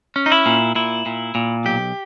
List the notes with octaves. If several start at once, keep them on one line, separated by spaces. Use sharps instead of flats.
C#4
D#4
E4
A#2
A#2 E4
A#2
A#2
B1 G4